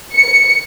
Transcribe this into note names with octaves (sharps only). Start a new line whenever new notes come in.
C#7